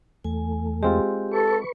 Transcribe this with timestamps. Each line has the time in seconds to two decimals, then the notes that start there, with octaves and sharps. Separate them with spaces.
0.24 E2 A3 G#5
0.83 G#3 C4 F4 G4
1.31 A4 B4 C#6